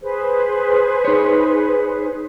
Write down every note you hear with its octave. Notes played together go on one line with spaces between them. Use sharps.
G#4 B4 C5
D#4 C#5